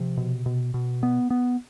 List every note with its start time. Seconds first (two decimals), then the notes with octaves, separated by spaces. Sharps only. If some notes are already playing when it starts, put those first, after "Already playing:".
Already playing: C3 F3
0.17 B2
0.46 B2
0.74 B2
1.03 B3
1.30 B3